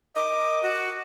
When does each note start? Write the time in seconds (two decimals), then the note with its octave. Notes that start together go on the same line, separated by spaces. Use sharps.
0.16 A#4 D#5 D6
0.63 F#4